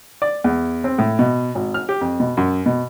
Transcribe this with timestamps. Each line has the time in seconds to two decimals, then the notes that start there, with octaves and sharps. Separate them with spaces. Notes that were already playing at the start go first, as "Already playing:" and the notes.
0.22 D5
0.44 E2
0.84 C4
0.98 A2
1.19 B2
1.55 G#1
1.74 F6
1.89 G4
2.01 F2
2.20 B2
2.37 F#2
2.66 B2